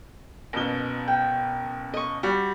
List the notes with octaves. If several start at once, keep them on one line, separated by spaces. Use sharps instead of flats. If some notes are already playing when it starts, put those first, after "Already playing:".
F#1 B2 G7
G5
D#5 C#6
G3 F#4